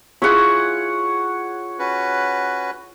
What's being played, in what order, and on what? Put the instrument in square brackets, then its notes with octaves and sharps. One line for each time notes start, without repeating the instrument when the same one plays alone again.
[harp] E4 F4 G#4 [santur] C#5 F#5
[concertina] C#4 F#4 B4